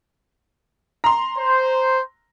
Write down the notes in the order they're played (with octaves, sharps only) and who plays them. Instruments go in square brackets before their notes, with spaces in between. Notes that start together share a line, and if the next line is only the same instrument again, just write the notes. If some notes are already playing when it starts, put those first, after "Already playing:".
[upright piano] A#5 C6
[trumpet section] C5